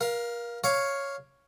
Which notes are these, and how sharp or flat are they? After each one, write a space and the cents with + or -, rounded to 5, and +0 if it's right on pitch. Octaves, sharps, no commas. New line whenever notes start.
A#4 +30 F5 +0
C#5 +0 F5 +0 D6 +0